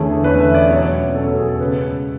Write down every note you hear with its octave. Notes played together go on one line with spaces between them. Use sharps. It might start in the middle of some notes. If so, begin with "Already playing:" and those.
Already playing: E2 D3 A3 C#4 G#4
E2 D3 A3 C#4 B4
E5
D5
B2 F#3 C#4 C#5
B2 F#3 C#4 A4
A4
G#4
A4
C#3 G#3 C#4 B4